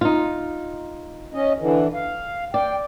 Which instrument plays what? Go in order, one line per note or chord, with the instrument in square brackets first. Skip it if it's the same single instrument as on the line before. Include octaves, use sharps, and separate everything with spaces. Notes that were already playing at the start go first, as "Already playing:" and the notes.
[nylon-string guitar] D#4 F4
[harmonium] C#4 D#5
D3 E3
F5
[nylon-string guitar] D5 [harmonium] G5